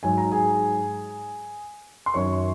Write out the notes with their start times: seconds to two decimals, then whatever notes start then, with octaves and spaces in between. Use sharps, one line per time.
0.03 G#2 F#3 G#5
0.18 A#5
0.32 G#4 G#5
2.06 C6
2.14 F#2 D#3 F#3 C#5 C#6